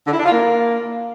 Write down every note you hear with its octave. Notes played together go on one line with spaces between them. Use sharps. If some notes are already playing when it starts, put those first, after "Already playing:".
D3
E4
D4
F4
A#3